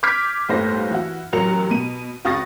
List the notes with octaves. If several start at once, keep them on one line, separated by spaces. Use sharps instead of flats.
D6 F6 G6 G#6 B6 D7
G1 D#2 A2 A3 C5 A#6
E3 E4 F#4
A1 F#3 A#4 C#7 F7
B2 D#7
C#2 F#4 C#6 D#6 A6 A#6